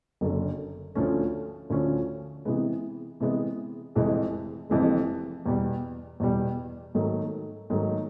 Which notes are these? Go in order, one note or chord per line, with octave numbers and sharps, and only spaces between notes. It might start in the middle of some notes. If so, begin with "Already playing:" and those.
F#1 F#2 D3
D2 D3 F3 A3 C#4
D2 D3 F3 A3 C#4
C3 E3 G#3 B3
C3 E3 G#3 B3
F1 F2 C3 E3 G#3
F1 F2 C3 E3 G#3
E2 B2 G3
E2 B2 G3
G#2 D#3 F#3 A3
G#2 D#3 F#3 A3